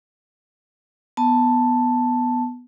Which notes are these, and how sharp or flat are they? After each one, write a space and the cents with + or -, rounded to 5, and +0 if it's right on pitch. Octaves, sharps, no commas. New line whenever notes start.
B3 +0 A5 +0